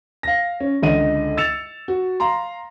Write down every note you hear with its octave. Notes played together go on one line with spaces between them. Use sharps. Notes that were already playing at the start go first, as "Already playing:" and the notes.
F5 A#6
C#4
C#2 D3 D#5 D#7
E6 A6 C#7 E7 F7
F#4
F5 A#5 C6